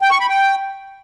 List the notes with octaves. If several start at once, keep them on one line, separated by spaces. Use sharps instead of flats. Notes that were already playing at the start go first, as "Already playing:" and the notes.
G5
C#6
B5
G5